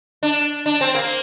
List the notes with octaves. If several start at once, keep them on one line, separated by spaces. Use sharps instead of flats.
D4
D4
C4
A#3